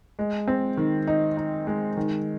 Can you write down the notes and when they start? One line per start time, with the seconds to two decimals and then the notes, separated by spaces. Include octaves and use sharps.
0.19 G#3
0.48 C4
0.77 D#3
1.07 D#4
1.37 D#4
1.67 G#3
1.97 D#3